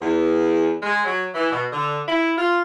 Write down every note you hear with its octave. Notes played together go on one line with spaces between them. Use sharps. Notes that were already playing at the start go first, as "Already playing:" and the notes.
E2
G#3
F#3
E3
B2
D3
E4
F4